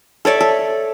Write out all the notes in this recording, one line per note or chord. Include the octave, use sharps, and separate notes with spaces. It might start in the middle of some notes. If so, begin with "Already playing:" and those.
A4 C#5 D5 E5
A4